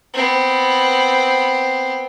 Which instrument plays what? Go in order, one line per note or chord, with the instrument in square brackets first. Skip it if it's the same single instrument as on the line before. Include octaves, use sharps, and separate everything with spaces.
[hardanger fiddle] B3 C4